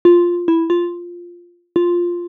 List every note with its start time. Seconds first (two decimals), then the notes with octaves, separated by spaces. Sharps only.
0.05 F4
0.48 E4
0.70 F4
1.76 F4